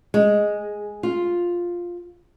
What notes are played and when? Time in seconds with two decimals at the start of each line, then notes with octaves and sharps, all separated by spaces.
0.14 G#3
1.03 F4